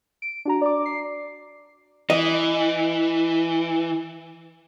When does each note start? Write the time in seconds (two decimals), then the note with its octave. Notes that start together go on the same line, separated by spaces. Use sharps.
0.22 D7
0.45 D4 F#4 A#5
0.61 D5 D6
0.86 C7
2.10 E3 D#5